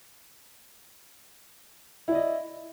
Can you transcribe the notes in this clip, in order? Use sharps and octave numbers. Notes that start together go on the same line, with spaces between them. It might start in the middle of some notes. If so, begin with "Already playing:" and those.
E4 D5 D#5